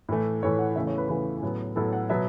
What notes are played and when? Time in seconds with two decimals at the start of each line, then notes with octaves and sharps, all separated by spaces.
0.09 A2 E3 A3
0.43 A2 E3 A3 C#5
0.59 F#5
0.76 E2 C#3 E3 A3 E5
0.87 C#5
0.98 B4
1.08 E2 C#3 E3 A3 B4
1.42 A2 F#3 B3
1.76 A2 F#3 B3 A4
1.93 F#5
2.09 B2 F#3 B3 E5